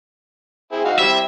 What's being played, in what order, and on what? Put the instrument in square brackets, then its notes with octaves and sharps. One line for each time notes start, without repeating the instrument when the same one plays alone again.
[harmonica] C4 E4 G#4
D#4 F#4 F5
[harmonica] G3 C4 E4 [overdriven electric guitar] E5